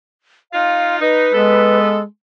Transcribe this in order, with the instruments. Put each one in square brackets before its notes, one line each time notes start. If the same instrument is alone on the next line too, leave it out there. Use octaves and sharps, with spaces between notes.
[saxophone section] D#4 F4 [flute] F5
[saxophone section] D#4 [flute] B4
[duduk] G#3 [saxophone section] B3 A4